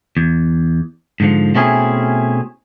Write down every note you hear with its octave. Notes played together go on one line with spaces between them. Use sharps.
E2
G#2 D3 F3
B2 A3 C4 C#4 E4 G#4